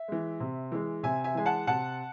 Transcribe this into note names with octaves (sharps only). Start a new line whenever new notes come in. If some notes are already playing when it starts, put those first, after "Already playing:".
Already playing: E5
E3 G#3
C3
E3 G#3
C3 E5 G#5
E5 G#5
E3 G#3 G#5
F#5 A5
C3 F#5 A5